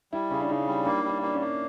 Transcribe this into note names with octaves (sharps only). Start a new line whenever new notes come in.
G3 E4
C#3 C#4
D4
C#3 D#4
G3
A#3 D4
G3 D4
A#3 D4
C#4
A#3